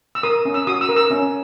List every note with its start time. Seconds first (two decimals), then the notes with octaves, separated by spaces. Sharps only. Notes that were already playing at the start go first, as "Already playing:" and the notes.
0.15 E6
0.23 A#4 D#6
0.45 C#4
0.54 E6
0.67 F#4 D#6
0.81 E6
0.89 A#4
0.96 E6
1.10 C#4